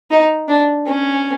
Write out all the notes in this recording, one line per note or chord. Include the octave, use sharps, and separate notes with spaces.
D#4
D4
C#4